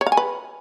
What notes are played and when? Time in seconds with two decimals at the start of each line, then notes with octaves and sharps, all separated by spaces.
0.01 C#5
0.06 F5
0.12 G#5
0.17 B4